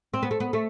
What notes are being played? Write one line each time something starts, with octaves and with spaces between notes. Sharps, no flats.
C4
B3
A3
B3
A3